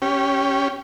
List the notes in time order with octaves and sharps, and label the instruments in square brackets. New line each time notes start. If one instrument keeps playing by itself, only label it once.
[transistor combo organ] C#4 G4